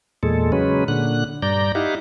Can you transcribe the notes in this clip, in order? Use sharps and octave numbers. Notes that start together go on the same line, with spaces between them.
E2 A#2 G#3 A4
C#3 F#3 G#3 C#4 B4
A#2 D3 F#6
G2 D5 A#5 G6
D#4 E4 G4 F5 F#5